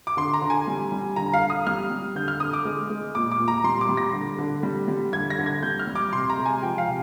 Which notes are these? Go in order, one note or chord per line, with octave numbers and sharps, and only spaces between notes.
D6
D3 C6
A#5
D3
G#5
G3
G3
D3 A#5
F5
D3
D#6
G3 F6
G3
D3 G6
F6
D3 D#6
D6
G#3
G#3
A#2 D6
D6
A#2
A#5
G3 C6
D6
G3
A#6
D3
D3
G3
G3
D3 G#6
A#6
D3
G#6
G3 G6
F6
G3
D6
C3 C6
A#5
G#3
G#5
F3 G5
F5
C3